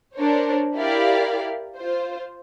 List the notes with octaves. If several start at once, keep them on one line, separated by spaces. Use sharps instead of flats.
D4 A#4 C5 C#5
E4 G4 A#4 D5 F5
F4 C5